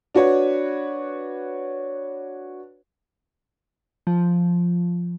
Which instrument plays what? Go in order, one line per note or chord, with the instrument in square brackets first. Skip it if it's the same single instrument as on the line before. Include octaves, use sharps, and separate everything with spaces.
[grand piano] D4 F#4 B4 C#5
[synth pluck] F3